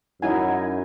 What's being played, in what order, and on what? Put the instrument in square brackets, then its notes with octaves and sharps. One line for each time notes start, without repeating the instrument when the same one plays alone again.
[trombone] F#2 [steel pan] D#4 E4 G#5 [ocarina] F#5